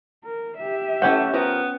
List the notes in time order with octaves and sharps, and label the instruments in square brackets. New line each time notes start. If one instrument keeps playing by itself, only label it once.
[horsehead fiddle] A#4
G4 E5
[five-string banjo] E3 A4 F#5 [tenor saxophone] A3 [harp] C#4 C#5 G5
[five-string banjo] F3 A#4 [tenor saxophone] B3